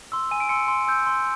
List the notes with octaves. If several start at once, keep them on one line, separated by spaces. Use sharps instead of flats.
C6 E6
G#5 D#7
D7
C6 E6 C#7
C6
E6 G6
C6